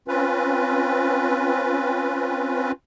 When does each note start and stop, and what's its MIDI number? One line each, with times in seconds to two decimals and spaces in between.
0.08 2.72 60
0.08 2.72 61
0.08 2.72 65
0.08 2.72 71